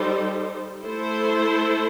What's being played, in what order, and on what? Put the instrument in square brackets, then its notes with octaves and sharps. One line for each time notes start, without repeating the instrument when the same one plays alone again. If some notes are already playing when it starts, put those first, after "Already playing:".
Already playing: [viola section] G3 D#4 A4 C5
A3 E4 A4 C5